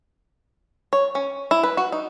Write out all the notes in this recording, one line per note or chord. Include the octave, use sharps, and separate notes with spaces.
C#5
C#4
E4
B4
F#4
D#4